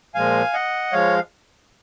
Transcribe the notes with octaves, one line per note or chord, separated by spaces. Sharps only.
A#2 F3 G#3 F5 G#5
D#5 F#5
F3 G#3 C#5 F5